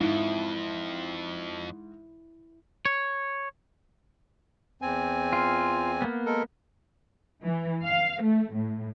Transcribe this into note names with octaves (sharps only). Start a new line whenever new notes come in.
F2 G#2 E4
C#5
E2 C4 G#5
F4
A#3 B3
G#3 A4 A#4
E3
F5
A3
A2